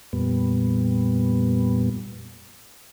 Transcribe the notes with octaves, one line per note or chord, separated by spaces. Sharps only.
F2 A#2 G3 B3